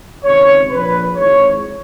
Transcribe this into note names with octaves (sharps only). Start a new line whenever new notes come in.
C#2 C3 D#3 C#5
A#1 A#2 B4
G#1 G#2 E3 C#5